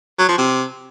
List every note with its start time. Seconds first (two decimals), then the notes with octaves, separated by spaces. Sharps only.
0.19 F#3
0.28 F3
0.38 C3